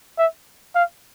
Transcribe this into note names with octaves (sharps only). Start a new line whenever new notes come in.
E5
F5